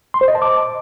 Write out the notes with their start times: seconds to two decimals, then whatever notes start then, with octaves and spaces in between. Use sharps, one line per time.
0.14 C6
0.21 C5
0.28 D#5
0.35 A5
0.42 D6